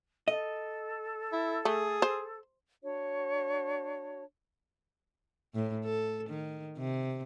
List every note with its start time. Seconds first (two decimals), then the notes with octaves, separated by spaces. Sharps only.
0.28 A4 D#5
1.32 E4
1.65 A3 G#4
2.02 C5
2.82 D4 F#4 C#5
5.54 A2
5.85 A4
6.29 D#3
6.78 C3